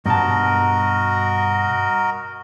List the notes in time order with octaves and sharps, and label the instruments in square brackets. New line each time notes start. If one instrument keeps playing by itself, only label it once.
[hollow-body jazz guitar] G2 B2 A5 [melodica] F#4 A#4 D#5